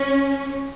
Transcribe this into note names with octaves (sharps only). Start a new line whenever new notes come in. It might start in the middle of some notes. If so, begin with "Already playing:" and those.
Already playing: C#4